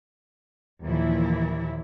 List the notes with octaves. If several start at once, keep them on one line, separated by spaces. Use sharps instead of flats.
D#2 A#2 E3 F3 E4